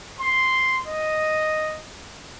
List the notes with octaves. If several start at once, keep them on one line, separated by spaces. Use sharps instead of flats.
C6
D#5